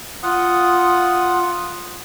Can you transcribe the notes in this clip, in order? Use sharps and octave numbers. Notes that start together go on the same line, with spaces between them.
F4 F#5 D#6